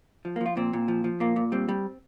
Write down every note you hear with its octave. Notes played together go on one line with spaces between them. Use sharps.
F3
A#3
F3
F4
A#2 C4
A#2
F3
F3
A#2 A#3
A#2
G3 C4
G3